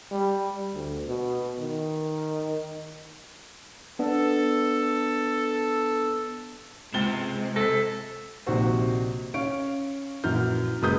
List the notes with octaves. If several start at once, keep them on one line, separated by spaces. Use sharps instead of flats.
G3
D2
B2
D#3
B3 D4 A4
C#2 C3 G#3 A6 G7
A4 A#6 B6
A#1 C3 D#3 F#4 C5
C#4 F5 C#6 D7
A#1 F#2 E3 F6 G6
F#1 F#2 G#3 B4 D#6 G6